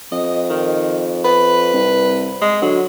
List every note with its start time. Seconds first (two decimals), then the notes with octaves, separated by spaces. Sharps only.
0.12 F2 D#5
0.50 D#3
1.25 B4
1.74 C2
2.42 G#3
2.62 D3 F#3